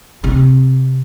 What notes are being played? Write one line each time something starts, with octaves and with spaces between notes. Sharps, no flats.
C3